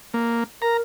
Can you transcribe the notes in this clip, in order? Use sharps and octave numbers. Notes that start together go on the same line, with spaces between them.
A#3
A#4 A#5